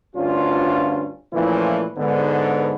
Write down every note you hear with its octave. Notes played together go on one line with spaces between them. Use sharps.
D2 G2 C#4 D4 F4
A#2 E3 F3 A3 C#4 E4
G#2 D3 B3